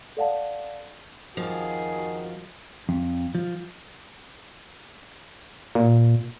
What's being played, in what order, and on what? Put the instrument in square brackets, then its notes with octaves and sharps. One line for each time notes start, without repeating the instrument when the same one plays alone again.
[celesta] A4 D5 F5 F#5 A5
[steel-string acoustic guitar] F2 F3 [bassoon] D#3 [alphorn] F#4 [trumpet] G#4
[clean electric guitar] F2
F3
[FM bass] A#2